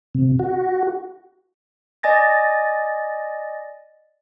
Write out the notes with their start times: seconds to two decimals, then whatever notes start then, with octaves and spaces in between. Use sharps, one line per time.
0.15 C3
0.39 F#4
2.03 D5 D#5 G#5 A6 A#6